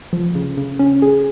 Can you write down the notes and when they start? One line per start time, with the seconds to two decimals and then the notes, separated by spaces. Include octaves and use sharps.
0.13 F3
0.35 C#3
0.57 C#3
0.79 C#4
1.02 G#4